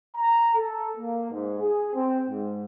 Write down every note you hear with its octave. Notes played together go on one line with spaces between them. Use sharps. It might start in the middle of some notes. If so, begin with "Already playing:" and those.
A#5
A4
A#3
G#2
G#4
C4
G#2